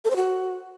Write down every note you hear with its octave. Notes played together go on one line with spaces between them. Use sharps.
A4
C5
F#4